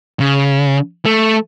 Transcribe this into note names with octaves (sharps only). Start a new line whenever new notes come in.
C#3
A3